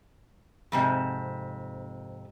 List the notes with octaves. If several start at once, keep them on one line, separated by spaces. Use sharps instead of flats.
F2 G#2 C3